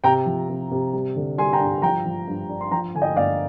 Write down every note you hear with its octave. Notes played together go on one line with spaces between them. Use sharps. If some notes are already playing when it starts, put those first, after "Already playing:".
C3 G5 A#5
F3
C3
C3
G3
D3
G3 G#5 C6
G5 A#5
G2
F3 G5 A#5
F3
G2
D4
C6
F3 G5 A#5
D3 G#5
D#5 G5
G1 D5 F5